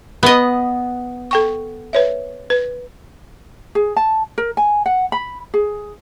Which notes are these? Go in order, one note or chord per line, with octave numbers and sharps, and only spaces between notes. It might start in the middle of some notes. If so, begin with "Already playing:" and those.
B3 D#5
A4 G5 C#6
B4 C#5 E5
B4
G#4
A5
A#4
G#5
F#5
B5
G#4